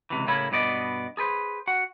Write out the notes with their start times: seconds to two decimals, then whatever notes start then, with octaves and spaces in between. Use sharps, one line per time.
0.10 C#2 C3 E3
0.27 A2 C#3 A#3 E4 C#5 B5
0.51 G2 B2 B3 D5 D#5
1.17 G#4 A4 B4 C5
1.67 F#4 F#5